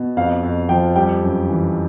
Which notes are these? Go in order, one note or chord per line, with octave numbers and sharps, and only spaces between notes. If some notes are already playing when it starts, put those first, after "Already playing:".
Already playing: B2
F2 F5
F2
F3 G5
G3 G5
F#2
E3